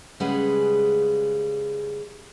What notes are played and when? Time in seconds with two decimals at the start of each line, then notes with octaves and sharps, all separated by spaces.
0.20 C#3 G3 G#3 G#4 B4 F#5